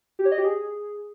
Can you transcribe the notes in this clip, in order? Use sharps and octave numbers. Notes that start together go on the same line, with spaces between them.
G4
C#5
D#5
G4
G#4